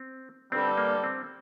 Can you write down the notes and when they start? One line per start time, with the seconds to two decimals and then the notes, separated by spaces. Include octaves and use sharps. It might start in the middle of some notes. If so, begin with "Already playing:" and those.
Already playing: C4
0.51 G2 D3 G3 C4 D4 A4
0.77 A#3
1.04 C4